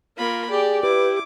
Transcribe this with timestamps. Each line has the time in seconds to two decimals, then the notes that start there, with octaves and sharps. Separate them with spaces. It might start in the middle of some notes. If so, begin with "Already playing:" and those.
0.17 A#3 F4 A#4 B5
0.50 G4 G#4 D5
0.83 E4 G4 B4 D6